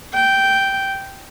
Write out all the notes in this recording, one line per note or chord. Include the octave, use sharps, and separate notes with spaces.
G5